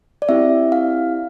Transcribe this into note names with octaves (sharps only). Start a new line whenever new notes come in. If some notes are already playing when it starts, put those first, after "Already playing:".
D5
C4 E4 G4 E5
F5